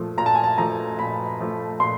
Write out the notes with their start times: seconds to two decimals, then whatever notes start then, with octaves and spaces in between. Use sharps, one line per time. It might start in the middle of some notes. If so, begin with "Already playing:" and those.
Already playing: A#2 F3 A3
0.18 A#2 A#5
0.26 A5
0.35 G#5
0.44 A5
0.58 F3 A3 A#5
0.99 A#2 B5
1.40 F3 A3
1.80 A#2 C6